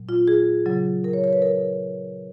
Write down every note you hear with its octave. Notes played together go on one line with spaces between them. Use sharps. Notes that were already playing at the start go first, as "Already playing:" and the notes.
Already playing: A#2 F#3
F4
G#4
C#3 F#3
A#4
C#5
C#5
B4
A#4